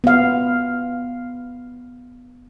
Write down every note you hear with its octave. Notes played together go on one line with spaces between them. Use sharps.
B3 F5